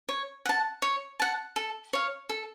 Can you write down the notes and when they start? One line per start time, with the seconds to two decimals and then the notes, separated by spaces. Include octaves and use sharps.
0.09 C#5
0.45 F#5 A5
0.82 C#5
1.20 F#5 A5
1.56 A4
1.93 C#5 F5
2.29 A4